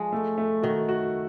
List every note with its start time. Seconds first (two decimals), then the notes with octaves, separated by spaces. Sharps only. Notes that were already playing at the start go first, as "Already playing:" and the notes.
Already playing: F3 G#3
0.13 A3
0.38 A3
0.63 D#3 F#4
0.89 F#4